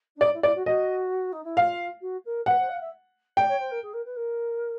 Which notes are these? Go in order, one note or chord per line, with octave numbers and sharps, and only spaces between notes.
D4
D#4 D5
E4
E4 D5
F#4
F#4 D#5
D#4
E4
F4 F5
F#4
A#4
B4 F#5
C5
F5
E5
D5 G5
C#5
C5
A#4
G#4
A#4
B4
A#4